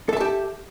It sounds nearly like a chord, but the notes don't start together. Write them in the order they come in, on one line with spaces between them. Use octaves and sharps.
A4 E5 A5 G4